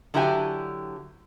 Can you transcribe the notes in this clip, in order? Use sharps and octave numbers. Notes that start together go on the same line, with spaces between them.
D3 F#3 E4 G4 B4 G#5